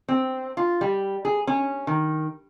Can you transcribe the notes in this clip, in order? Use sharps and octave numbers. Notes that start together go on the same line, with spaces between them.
C4
F4
G3
G#4
C#4
D#3